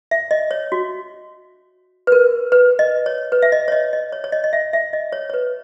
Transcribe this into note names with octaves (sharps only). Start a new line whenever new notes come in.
E5
D#5
C#5
F#4
B4
A#4
B4
D#5
C#5
B4
E5
D#5
C#5
D#5
D#5
C#5
C#5
D#5
D#5
E5
E5
D#5
C#5
C#5
B4